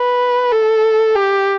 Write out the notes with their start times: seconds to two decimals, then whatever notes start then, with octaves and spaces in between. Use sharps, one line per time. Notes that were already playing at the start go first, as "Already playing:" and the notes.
Already playing: B4
0.52 A4
1.15 G4